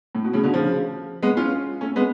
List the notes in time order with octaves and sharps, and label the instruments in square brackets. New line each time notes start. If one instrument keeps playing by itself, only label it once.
[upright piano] A2
B2
A2 C#3
B2 D3
C#3 F3
G#3 B3
C#4 F4
A3 C#4
G#3 B3